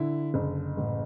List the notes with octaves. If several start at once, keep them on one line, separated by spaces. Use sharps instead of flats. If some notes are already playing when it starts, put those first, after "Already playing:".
Already playing: D3 E4
F#1
A1